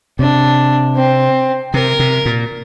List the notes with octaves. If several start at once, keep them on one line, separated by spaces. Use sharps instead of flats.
C3 D4
C4
C3 A#4
C3
A#2